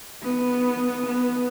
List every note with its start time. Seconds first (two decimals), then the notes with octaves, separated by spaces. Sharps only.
0.23 B3
1.07 B3